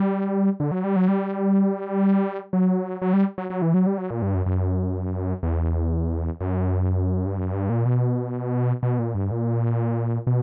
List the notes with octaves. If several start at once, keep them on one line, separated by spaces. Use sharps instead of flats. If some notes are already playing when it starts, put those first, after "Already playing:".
Already playing: G3
D3
F#3
G3
F#3
G3
F#3
F#3
G3
F#3
F#3
E3
F#3
G3
F#3
A#2
G2
F#2
F#2
E2
F#2
G2
F#2
G2
A#2
B2
B2
A#2
G2
A#2
B2